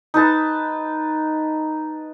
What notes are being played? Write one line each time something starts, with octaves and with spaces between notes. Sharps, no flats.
D#4 B4 A5